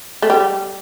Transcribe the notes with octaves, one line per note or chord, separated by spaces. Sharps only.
A3
G3